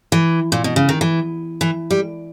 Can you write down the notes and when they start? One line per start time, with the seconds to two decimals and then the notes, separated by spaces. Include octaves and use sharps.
0.12 E3
0.52 A#2
0.64 B2
0.76 C#3
0.89 D#3
1.01 E3
1.61 E3
1.91 G3